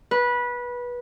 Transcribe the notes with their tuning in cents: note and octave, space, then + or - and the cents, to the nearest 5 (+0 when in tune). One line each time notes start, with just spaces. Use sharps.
B4 -20